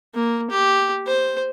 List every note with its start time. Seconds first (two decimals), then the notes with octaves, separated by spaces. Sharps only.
0.14 A#3
0.50 G4
1.06 C5